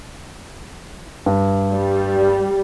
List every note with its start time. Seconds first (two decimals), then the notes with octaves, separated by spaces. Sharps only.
1.26 G2
1.72 G3